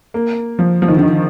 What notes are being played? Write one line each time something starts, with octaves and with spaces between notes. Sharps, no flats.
A#3
F3
F3
D#3
D3
D#3